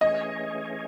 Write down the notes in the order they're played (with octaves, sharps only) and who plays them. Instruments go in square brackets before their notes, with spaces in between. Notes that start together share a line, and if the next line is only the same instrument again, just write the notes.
[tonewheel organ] E3 A3 C#4 G#4 C#5 [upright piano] D#5